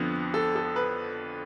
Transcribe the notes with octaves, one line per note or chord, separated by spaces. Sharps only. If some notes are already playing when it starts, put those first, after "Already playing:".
Already playing: F2 D3 F3 B3
A4
A4
B4